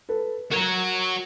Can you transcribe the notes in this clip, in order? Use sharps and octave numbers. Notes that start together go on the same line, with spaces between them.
A4 B4
F#4 A#4 C#5 A#5